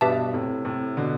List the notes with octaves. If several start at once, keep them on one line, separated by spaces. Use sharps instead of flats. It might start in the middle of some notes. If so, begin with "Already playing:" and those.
G2 B2 G4 B4 E5 A5
A2 C3
A2 C3
B2 D3